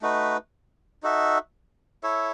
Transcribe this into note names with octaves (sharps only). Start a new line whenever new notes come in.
A3 D#4 F#4 B4
D#4 F#4 A4 E5
E4 A4 C#5 E5